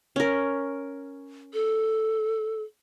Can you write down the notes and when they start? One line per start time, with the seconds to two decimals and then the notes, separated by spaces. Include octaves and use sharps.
0.16 C#4 A#4
1.54 A4